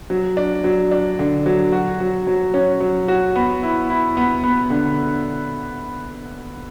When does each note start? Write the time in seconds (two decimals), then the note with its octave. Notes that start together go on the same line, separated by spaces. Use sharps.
0.10 F#3
0.37 D4
0.64 F#3
0.91 D4
1.19 D3
1.46 F#3
1.72 F#4
2.00 F#3
2.27 F#3
2.54 C#4
2.80 F#3
3.08 F#4
3.36 B3
3.63 E4
3.90 E4
4.17 B3
4.44 B3
4.70 D3